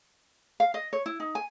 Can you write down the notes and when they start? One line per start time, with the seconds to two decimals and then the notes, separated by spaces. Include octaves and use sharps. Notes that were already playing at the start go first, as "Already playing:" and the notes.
0.60 F5
0.74 D#5
0.93 C#5
1.06 E4
1.20 D#4
1.35 G#5